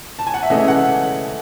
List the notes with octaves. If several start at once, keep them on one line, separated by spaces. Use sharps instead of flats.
A5
G#5
F#5
E5
C#3 E3 A3 C#4 D#5
E5
F#5